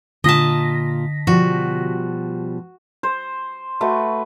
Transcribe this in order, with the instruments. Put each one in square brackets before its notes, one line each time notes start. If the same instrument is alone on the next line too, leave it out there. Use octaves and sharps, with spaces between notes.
[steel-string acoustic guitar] A#2 F4 [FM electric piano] D3 A#6 B6 [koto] D#5 A5
[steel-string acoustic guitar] B2 F3 G3 [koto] F#4
[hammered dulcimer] C5
A3 F#4 B4